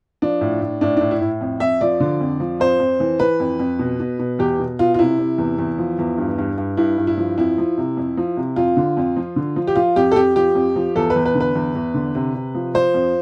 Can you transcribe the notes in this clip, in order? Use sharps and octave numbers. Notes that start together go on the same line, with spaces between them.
F3 D4
A2
A2
A2 D4
A2 D4
E4
A2
F2
F2 E5
F3 D5
D3
F2
F3
F2 C5
F2
E3
E3 B4
F2
F2
B2
B2
B2
E2 G4
B2
B2 F4
F4
C3 E4
C3
E2
E2
F3
E2
G2
G2
G2
G2 E4
G2
E4
F3
F2 E4
F3
C3
F2
F3
C3
F2 F4
D3
F2
F3
D3
F3
G4
F3 F4
F2 G4
A4
F2 G4
F3 G4
F2
F3
E2 A4
B4
E2
B4
D3
B4
E2
E2
D3
C3
C3
F3
F3 C5
F2